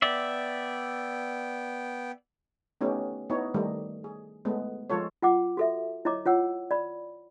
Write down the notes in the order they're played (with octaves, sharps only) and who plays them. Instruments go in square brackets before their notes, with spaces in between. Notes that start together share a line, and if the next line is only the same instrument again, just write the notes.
[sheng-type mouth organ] B3 G5 [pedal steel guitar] D5 E5
[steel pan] A3 B3 C#4 D#4 G4
B3 D#4 E4 C#5
D#3 G3 A3 D#4
G#4
G#3 A3 B3
F3 G#3 F4 A4 C#5
[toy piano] F4 F#5 D6
F#4 A4 E5
E4 C#5 D#5 A#5 D6
F4 C#5 F#5 E6
D5 B5